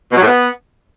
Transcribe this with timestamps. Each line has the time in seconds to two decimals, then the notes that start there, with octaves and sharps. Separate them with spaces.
0.12 B2
0.17 F#3
0.22 A2
0.27 B3